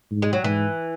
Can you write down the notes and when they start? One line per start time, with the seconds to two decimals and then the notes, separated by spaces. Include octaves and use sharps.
0.11 G#2
0.22 G#3
0.33 F#3
0.44 G#2 E3